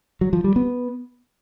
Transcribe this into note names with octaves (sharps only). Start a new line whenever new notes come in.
F#3
F3
G3
B3